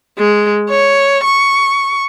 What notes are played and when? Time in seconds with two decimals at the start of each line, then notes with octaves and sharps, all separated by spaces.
0.18 G#3
0.70 C#5
1.24 C#6